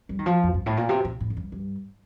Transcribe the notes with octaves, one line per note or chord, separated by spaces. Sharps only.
G3
D#3
F3
F2
G2
A2
A#2
C3
A#2
A2
F2
G2
G2